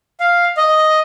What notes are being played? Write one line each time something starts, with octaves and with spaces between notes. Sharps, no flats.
F5
D#5